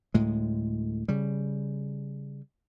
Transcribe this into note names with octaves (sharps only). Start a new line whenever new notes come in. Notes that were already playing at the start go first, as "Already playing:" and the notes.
D2 A2 G#3
C#3 G3